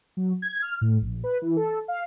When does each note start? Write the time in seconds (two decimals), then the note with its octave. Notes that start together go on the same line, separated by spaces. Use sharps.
0.17 F#3
0.42 G#6
0.62 F6
0.81 A2
1.01 A#1
1.24 B4
1.42 E3
1.57 A4
1.88 F5